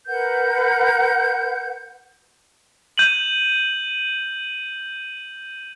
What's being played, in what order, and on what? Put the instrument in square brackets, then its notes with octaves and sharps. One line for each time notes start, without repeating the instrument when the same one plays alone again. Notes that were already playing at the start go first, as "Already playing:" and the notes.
[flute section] A#4 B4 F#5 G6
[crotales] G6 D#7 F#7